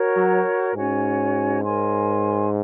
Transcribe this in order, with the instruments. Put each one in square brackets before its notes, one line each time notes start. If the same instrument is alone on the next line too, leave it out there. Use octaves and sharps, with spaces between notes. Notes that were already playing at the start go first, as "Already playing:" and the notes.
Already playing: [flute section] F#4 A#4 C#5
[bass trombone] F#3
[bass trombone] G#2 [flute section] C#4 F#4 C#5 G#5
[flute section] A#4 C#5 G#5 C6